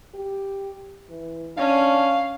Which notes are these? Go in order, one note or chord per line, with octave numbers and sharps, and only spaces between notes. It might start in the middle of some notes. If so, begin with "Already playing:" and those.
G4
E3
C#4 D4 F5